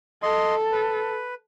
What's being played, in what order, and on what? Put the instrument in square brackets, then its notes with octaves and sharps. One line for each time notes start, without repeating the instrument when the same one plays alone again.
[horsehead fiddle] A4 [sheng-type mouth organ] D#5 C6
[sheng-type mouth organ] B4